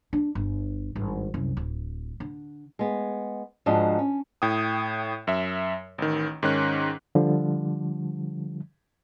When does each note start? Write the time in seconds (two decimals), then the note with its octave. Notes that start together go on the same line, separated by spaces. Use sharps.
0.13 D4
0.35 G1
0.95 G#1 G2
1.34 C2 F#2
1.57 D1
2.20 D3
2.79 G#3 B3
3.66 G#2 F3 D4 F#4 D#5
3.99 C#4
4.42 A2 G5 D#6
5.27 F#2 E5
5.98 A1 D#3
6.43 G#2 D#3 C#4 F#6
7.15 D3 F3 G3